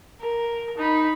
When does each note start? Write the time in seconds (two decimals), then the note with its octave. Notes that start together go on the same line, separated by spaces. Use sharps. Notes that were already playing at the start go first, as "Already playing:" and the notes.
0.21 A#4
0.77 D#4 B5